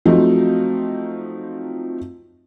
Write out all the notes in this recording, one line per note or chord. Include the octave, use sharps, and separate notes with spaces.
F3 F#3 A3 C4 D#4